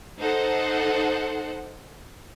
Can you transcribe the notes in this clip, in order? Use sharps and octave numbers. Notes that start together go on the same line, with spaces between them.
D#4 A4 C5 F#5